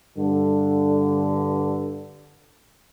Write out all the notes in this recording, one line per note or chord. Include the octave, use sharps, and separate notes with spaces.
G2 D3